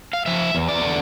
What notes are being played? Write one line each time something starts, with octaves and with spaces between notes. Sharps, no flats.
F5
F3 E5
E2
D5
D3